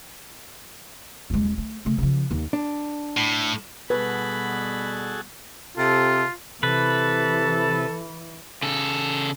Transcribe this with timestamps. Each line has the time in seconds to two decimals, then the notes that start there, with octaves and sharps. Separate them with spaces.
1.30 D#1 G#3
1.58 A3
1.85 C#3 A3
1.98 C#3 F3
2.31 D#2
2.53 D4
3.17 A2
3.90 B2 G3 B3 F#4 G#4 A4 B4 B5
5.77 C3 F4 A4
6.63 C3 E3 A4 B4
8.63 C#3 A4